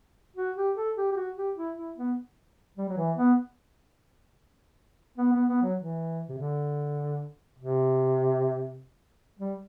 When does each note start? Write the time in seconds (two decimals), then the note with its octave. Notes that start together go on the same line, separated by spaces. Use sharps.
0.36 F#4
0.56 G4
0.76 A4
0.97 G4
1.12 G4
1.16 F#4
1.37 G4
1.57 E4
1.77 E4
1.97 B3
2.78 G3
2.89 F#3
2.97 E3
3.17 B3
5.18 B3
5.33 B3
5.48 B3
5.62 F#3
5.78 E3
6.29 C3
6.38 D3
7.59 C3
9.39 G3